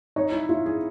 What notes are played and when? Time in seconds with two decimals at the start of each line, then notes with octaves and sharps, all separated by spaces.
0.16 D#4 C#5
0.32 E4
0.49 E4 F4
0.66 G#4